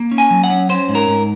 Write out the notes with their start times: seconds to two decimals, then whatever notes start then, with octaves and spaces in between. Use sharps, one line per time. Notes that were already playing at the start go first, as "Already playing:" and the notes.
Already playing: A#3
0.12 C#4
0.18 G#5
0.31 F#3
0.44 F#5
0.50 C#4
0.69 C#4 C5
0.89 G#2
0.95 A#4
1.08 G#2